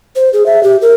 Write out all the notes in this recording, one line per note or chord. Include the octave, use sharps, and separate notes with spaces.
C5
G#4
E5
G4
A#4